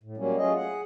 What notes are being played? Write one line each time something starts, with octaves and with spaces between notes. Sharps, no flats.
A2
F#3 G3 A#3 C#4
F#3 A3 C#4 F4 G#4 D#5
G#4 F#5